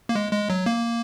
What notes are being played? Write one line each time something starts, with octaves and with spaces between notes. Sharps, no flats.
A#3
G#3
G#3
F#3
A#3